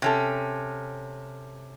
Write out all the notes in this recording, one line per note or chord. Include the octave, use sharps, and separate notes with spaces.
C3 C#4 A4